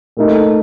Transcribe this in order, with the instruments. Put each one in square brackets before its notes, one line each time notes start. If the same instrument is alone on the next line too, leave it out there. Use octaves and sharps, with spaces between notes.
[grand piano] A#2 A3 D#4